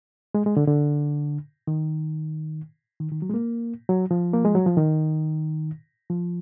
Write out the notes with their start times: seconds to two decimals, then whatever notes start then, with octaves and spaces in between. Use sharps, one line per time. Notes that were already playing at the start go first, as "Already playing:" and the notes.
0.35 G#3
0.46 G#3
0.57 D3
0.68 D3
1.67 D#3
3.00 D#3
3.12 D#3
3.22 F#3
3.30 G#3
3.34 A#3
3.89 F#3
4.11 F3
4.33 A#3
4.45 G#3
4.55 F#3
4.66 F3
4.77 D#3
6.10 F3